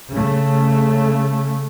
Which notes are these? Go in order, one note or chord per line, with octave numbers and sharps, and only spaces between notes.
C#3 A3